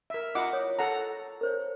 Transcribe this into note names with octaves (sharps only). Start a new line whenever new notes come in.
A#4 E5
E4 F4 D#5 F#5 A#5 D6
C#5 D#6
A4 F#5 A#5
A#4 C5 C#5